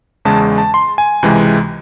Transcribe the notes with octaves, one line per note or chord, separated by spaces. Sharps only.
E2 C#3 G#3 A5
A5
C6
G#5
C#2 C3 E3 G#3